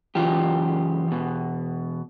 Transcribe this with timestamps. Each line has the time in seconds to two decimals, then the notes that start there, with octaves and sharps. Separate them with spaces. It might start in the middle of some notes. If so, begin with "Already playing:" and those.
0.15 F#2 C#3 E3 F4 G4
1.08 E2 B2